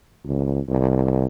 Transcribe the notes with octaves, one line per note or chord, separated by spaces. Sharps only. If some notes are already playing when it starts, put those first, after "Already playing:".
C#2
C2